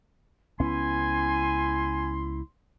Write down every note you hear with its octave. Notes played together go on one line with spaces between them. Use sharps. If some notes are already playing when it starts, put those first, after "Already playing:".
C#2 B3 C#4 E4 G#5 C6